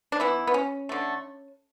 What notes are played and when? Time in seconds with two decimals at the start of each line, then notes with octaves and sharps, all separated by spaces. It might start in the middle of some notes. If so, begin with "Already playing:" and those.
0.12 D4
0.20 E3 B3 E4
0.47 B3
0.54 C#4
0.89 D3 A3